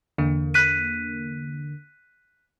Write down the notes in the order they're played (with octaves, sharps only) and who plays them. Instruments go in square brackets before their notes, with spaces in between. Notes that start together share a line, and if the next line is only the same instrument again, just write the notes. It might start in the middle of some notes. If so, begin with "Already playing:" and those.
[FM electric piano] E2 D3 A#3
[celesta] F#6 B6 D#7